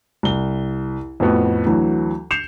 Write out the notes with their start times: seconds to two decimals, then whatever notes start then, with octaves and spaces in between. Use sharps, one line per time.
0.23 C2 G7
1.20 F2 A2 B3 F#4
1.66 D2 E3 F#3
2.31 G6 C7 C#7 E7 F7